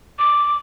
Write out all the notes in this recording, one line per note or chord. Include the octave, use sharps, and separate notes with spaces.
D6